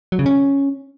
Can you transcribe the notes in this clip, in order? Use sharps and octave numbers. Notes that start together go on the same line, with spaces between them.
F#3
C#3
C#4